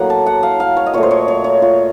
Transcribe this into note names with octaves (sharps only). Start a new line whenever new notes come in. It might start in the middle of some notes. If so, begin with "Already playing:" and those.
Already playing: A2 F#3 A#3 F#5
A5
F#5
F5
F5
C#5
D#5
A#2 A3 C#5
C5
C#5
C#5
C#5
F4